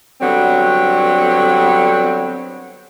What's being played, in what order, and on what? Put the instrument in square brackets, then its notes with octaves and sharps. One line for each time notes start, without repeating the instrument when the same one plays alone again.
[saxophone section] D3 F#3 G3 B3 C4